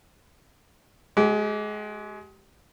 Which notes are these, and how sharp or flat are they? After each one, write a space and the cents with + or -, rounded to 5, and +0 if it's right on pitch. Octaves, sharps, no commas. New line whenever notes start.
G#3 +25 G4 -25